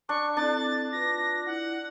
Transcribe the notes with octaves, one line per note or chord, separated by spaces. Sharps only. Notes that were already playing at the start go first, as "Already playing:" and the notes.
D4 C#6
C4 D4 E4 A4 A6
F4 B4 A#6
E4 F#5